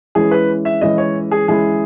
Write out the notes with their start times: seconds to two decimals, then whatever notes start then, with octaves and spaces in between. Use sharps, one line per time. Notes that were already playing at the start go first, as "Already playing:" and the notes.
0.15 E3 G#3 C#4 E4 G#4
0.31 B4
0.65 E5
0.81 E3 G#3 C#4 E4 D#5
0.98 C#5
1.31 G#4
1.48 E3 G#3 C#4 E4 G#4